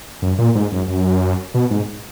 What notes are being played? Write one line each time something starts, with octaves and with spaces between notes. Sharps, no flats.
F#2
A#2
G#2
F#2
F#2
B2
G#2